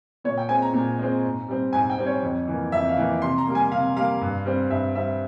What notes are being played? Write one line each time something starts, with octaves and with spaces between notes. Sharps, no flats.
A#2 C#5
G5
G#3 C4 G#5
A#5
A#2
G#3 C4
G#2
G3 C4
G#2 G#5
G5
G3 C4
C#5
F2
E3 A#3
F2 E5
F5
E3 A#3
C3 C6
A#5
G3 A#3
G#5
C3 F5
G3 A#3 F5
G2
G3 C4
G2 E5
G3 C4 E5